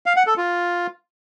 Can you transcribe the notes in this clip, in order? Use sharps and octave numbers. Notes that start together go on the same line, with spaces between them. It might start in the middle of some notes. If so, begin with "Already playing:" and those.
F5
F#5
A4
F4